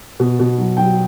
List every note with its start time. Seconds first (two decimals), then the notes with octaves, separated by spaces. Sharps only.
0.20 B2
0.39 B2
0.58 F#3
0.77 F#3 G5